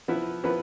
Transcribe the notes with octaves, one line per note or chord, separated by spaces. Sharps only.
F3 B3 E4 B4
F3 B3 E4 B4